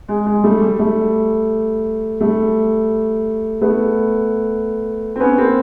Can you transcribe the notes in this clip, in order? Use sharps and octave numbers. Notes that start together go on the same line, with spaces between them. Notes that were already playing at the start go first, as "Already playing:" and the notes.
G#3
G#3
G3 A3
G3
G3 A3
G3 A3
A3 B3
C4
B3 C#4
A#3 C4